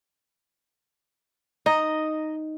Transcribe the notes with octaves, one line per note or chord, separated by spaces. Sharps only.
D#4 D#5 A#5